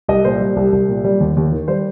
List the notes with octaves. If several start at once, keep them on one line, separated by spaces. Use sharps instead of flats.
C2 D#5
A#2 C5
G3
C2
C2
A#2
G3
D#2
D#2
D#3
G3 C5